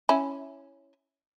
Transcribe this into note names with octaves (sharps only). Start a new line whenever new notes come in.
C#4 E4